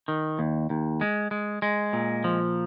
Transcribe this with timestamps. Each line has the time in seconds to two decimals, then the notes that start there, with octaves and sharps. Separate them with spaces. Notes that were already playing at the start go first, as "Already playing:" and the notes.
0.08 D#3
0.39 D#2
0.70 D#2
1.01 G#3
1.31 G#3
1.62 G#3
1.93 A#2
2.24 F3